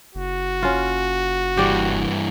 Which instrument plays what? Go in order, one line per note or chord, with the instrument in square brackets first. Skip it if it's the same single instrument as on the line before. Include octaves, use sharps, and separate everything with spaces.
[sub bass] F#1 [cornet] F#4
[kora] C#4 F4
[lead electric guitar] G2 E3 [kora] G4 D5